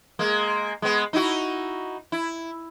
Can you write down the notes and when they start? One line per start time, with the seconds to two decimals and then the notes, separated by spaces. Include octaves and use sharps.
0.19 G#3 A#3
0.82 G#3 B3
1.13 D#4 E4 F#4
2.12 E4